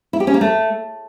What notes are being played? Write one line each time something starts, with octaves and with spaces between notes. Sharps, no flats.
E4
G4
C#4
A#3
A3